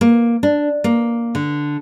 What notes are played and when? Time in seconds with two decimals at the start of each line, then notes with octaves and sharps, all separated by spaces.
0.01 A#3
0.43 D4
0.84 A#3
1.35 D3